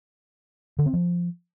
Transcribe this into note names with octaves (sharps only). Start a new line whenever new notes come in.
D3
C4
F3